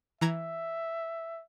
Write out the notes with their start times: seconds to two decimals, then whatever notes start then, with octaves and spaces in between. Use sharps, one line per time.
0.21 E3 E5 A#5 G#6